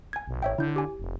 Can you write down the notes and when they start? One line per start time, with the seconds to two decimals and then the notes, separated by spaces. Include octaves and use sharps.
0.13 G#5 G#6
0.28 B1
0.42 A1 C#5 E5 G5
0.58 D3 E4 G6
0.76 G4 G#5
1.00 F1